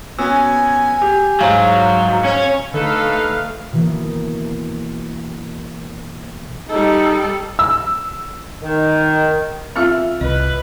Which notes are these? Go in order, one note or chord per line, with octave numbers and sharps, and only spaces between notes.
B3 C#4 F#4 G#5 E6
G4
G#2 F#3 C5 F5
C#4 C#5
D3 A3 D#4 A4 B4 F5
B2 E3 A#3
G3 D#4 A4
E6
D#3
C4 F4 E5 F5 E6 F6
C2 B4 D#5